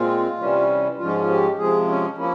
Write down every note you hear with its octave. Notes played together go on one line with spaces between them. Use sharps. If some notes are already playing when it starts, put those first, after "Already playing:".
Already playing: A#2 G#3 C4 F4
C3 E3 G3 C#4
G#2 F3 G#3 C#4 F4
G4
C3 F3 G#3 G#4
C#4
F3 A#3 C#4 E4